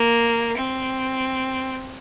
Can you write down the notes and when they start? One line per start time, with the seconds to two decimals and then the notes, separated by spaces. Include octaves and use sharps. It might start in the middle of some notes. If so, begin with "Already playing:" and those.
Already playing: A#3
0.57 C4